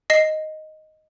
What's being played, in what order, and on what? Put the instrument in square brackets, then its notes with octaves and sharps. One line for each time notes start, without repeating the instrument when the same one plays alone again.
[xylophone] D#5 A#6 C7